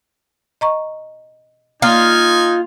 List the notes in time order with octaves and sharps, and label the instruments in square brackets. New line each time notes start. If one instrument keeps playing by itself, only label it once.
[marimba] D#5 A#5 C#6
[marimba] A#3 [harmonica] D#4 G#5 [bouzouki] F4